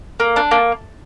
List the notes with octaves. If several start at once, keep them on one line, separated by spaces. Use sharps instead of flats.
A#3
D4
A#3